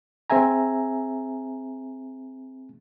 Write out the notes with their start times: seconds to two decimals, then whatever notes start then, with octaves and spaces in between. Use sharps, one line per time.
0.30 C4 G#4 E5 G#5 A#5